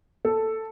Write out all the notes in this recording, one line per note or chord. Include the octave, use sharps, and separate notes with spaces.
A4